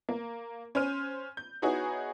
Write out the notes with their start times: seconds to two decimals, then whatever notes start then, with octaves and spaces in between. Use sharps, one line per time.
0.09 A#3
0.75 C#4 C5 F6 D#7
1.37 G6
1.62 B3 D#4 E4 F#4 G#4 C#5